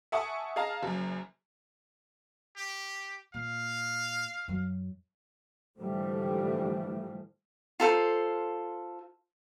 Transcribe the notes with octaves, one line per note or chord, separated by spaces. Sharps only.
E5 F#5 G#5 A5 C#6 D#6
G#4 D#5 F5 A5 A#5
F#1 F#2
G4
A#2 F5
F#2 F#3
G#2 D3 E3 F3 G3 A3
F4 A4 C5